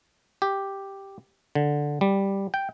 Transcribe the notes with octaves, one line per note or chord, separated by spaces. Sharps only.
G4
D3
G3
G5